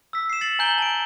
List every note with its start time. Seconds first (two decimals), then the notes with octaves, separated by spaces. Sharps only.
0.13 E6 B6
0.30 C7 E7
0.41 A6 C#7 F#7
0.59 G#5 A#5 G6 F#7 G7
0.78 A5 D7